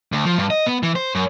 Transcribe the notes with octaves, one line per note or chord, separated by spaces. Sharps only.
D2
F3
G2
D#5
B3
E3
C5
F#2